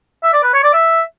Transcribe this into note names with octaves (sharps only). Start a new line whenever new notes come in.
E5
D5
B4
C#5
D5
E5